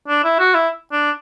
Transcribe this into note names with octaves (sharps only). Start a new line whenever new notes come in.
D4
E4
F#4
E4
D4